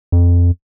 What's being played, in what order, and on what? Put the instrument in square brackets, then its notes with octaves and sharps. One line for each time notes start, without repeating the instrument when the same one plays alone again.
[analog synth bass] F2